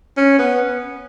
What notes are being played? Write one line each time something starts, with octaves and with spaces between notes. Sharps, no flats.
C#4
B3